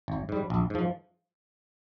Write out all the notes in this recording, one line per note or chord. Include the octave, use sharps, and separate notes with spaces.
G#1
G#2 G3
A#1
G#2 F3